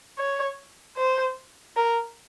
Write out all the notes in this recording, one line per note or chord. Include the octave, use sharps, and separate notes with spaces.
C#5
C5
A#4